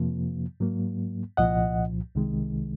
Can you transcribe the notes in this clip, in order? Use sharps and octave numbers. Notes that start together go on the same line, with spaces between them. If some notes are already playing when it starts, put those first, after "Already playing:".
Already playing: F2 C3 F3 A#3
G#2 F#3 A#3
C2 A#2 F3 D#5 F#5
C2 C3 D#3 G#3